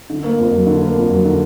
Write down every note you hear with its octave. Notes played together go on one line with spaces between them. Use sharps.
D3
A#3
F2
F#3
D3
A#3
F2
F#3
D3